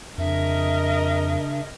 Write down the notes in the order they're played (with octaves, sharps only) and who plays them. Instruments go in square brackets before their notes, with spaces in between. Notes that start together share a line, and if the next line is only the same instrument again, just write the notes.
[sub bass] F2 [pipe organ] C#3 D4 [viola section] A#4 D#5 [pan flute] E5